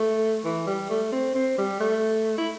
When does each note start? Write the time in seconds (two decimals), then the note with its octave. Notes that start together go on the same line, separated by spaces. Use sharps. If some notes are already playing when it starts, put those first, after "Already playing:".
Already playing: A3
0.45 E3
0.67 G3
0.90 A3
1.12 C4
1.35 C4
1.58 G3
1.80 A3
2.38 E4